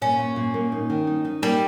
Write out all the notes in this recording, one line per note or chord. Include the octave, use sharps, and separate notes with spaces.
A#2 C#4
A#2
A#2
A#3
D#4
D#3
D#4
D#4
G3 A#3